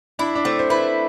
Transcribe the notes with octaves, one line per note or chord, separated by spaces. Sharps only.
D4 E4
D4
A3 C4
C5
E4 B4